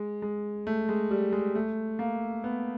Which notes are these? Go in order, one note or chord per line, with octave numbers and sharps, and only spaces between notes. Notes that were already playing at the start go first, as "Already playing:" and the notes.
Already playing: G#3
G#3
A3
G#3
G3
G#3
A3
A#3
B3